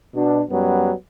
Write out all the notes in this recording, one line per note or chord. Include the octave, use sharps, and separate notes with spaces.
B2 D4
F#2 F#3 G3 B3